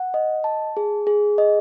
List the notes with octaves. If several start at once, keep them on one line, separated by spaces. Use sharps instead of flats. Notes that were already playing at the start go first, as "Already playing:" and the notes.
Already playing: F#5
D#5
A5
G#4
G#4
D#5